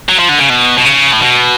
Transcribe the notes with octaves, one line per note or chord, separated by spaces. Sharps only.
F#3
F3
D3
C#3
B2
B2
C#3
A2
B2